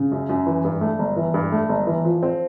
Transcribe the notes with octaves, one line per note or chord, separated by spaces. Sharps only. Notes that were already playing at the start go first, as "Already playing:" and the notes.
Already playing: C#3
F#2
F#2
E3
G2
A3
G1
E3
G2
A3
G1
E3
F3
C4